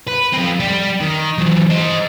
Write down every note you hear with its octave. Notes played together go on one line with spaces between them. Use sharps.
B4
F3 C4
G3 G4
D#3
E3 F#3
C5 D#5